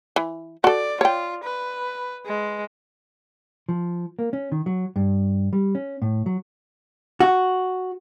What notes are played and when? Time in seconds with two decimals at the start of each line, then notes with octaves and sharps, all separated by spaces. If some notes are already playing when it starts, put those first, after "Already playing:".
0.16 E3
0.64 F#4 A4 D5
1.01 F4 C#5 G5
1.44 B4
2.26 G#3
3.69 F3
4.19 A#3
4.33 C#4
4.52 D#3
4.66 F#3
4.96 G2
5.53 G3
5.75 C#4
6.02 A2
6.26 F#3
7.20 F#4